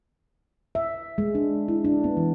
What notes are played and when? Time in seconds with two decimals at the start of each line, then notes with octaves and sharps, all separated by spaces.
0.75 E5
1.18 G#3
1.35 D4
1.68 E4
1.84 D4
2.04 B3
2.17 E3